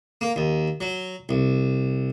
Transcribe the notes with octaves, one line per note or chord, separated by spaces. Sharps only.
A#3
D#2
F#3
C2